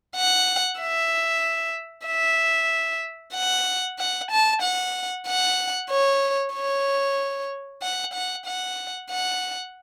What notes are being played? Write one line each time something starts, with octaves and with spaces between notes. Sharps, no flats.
F#5
E5
E5
F#5
F#5
A5
F#5
F#5
C#5
C#5
F#5
F#5
F#5
F#5